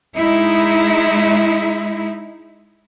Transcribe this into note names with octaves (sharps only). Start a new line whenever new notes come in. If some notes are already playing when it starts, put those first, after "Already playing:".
G#3 D#4 E4